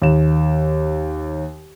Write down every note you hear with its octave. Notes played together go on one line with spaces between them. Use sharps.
D#2 E7